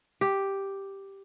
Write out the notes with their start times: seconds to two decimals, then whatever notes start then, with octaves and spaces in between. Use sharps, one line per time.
0.21 G4